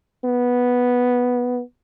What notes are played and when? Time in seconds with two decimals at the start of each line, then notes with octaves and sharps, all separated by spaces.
0.25 B3